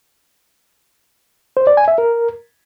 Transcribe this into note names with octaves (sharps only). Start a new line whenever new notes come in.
C5
D5
G#5
E5
A#4